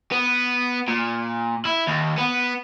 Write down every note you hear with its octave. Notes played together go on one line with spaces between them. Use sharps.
B3
A#2
E4
D#2
B3